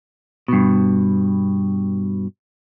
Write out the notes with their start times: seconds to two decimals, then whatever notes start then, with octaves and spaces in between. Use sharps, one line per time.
0.48 G2 B2